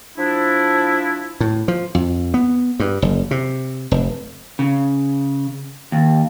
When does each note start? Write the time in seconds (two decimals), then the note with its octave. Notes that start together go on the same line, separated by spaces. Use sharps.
0.17 F3 D4 E4
1.40 A2
1.68 F3
1.95 F2
2.34 B3
2.80 G2
3.02 F#1
3.31 C3
3.91 F1
4.59 C#3
5.92 D#2